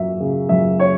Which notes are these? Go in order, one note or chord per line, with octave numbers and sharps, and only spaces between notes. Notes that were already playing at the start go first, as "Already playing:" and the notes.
Already playing: F#2 F#3 E5
C#3
F#2 E5
C#5